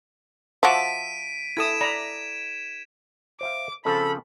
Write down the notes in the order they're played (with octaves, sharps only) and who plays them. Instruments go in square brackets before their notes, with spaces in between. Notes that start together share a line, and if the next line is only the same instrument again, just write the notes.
[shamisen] F3 F#4 [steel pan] E5 A5 D6 [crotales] B6 D7 D#7
[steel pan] E4 A4 D#6 [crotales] G#6 D7 E7
[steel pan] D5 A#5 B5
[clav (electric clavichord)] C5 E5 F5 [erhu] D6
[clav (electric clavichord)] C#3 F3 C4 [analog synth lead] A4 [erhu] B5